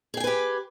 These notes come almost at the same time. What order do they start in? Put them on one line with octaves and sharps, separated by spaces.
G#4 G5 G#5 B4 G4